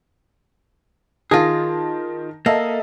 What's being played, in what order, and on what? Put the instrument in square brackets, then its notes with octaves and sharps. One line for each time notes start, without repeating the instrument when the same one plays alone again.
[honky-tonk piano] D#3 A5 A#6 [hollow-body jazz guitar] F4 G#4
[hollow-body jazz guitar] A#3 [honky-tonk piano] A4 D#5 E5